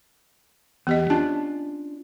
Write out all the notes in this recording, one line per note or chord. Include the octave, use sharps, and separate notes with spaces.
E2 B3 G4 D#5
C#4 D4 F4 A5